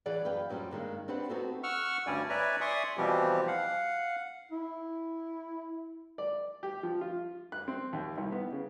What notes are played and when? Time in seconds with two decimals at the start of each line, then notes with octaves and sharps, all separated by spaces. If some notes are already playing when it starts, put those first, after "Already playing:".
0.06 E3 G#4 D5 F#5
0.24 F#2 B4 F5 G5
0.49 F#2 G3 C#4 F#4 G4 C5
0.71 G2 D#3 G#3 A#3
1.08 C4 D4 G4 B4 C5 F#5
1.29 B3 C4 D#4 F#4 G4 A4
1.64 F#5 C#6 E6 F6
2.07 D2 G2 G3 C#4 D5 G#5
2.30 B4 C#5 D5 E5 G#5 A#5
2.61 D5 E5 G#5 C6 C#6 D#6
2.98 B2 E3 F3 G3 C4 G4
3.48 F5 F#5
4.52 E4
6.18 D5
6.63 G4
6.83 F3
7.01 F4
7.52 F#6
7.68 C4
7.93 D#2
8.18 C2
8.32 B3
8.52 C#3